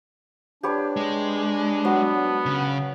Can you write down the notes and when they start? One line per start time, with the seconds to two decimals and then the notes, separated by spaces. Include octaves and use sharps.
0.63 D4 G4 B4 C#5
0.97 G#3
1.85 F#3 B3
2.46 C#3